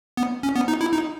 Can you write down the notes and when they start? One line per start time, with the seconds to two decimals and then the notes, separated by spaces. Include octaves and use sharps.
0.17 B3
0.43 C#4
0.56 B3
0.68 D#4
0.81 E4
0.93 D#4